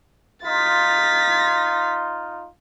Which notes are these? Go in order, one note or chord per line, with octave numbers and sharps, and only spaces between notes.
D#4 F4 A6 B6